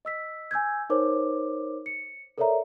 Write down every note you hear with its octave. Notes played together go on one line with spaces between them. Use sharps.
D#5 E6 B6
G#5 E6 G6 G#6
D#4 A#4 C5 C#5 D6
C#7
A4 A#4 C#5 D5 E5 A#5